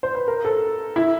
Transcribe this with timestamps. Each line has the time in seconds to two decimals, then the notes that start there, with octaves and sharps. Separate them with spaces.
0.03 C5
0.15 B4
0.28 A#4
0.45 A4
0.96 E4